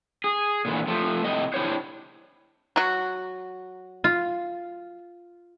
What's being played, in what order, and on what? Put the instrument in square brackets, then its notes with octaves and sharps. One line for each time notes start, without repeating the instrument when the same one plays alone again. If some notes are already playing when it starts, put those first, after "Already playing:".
[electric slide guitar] G#4
A#2 D3 E3
F3 A3
A2 C3 D#5
D4 E4 G4 C5 C#5
[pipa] F#3 F#4
[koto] F4